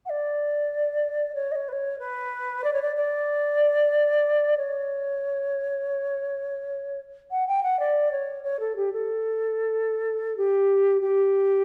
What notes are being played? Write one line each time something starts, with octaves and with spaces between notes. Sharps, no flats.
F#5
D5
C#5
D#5
C#5
B4
C#5
B4
D5
C#5
D5
D5
C#5
F#5
G5
F#5
D5
C#5
C#5
A4
G4
A4
G4
G4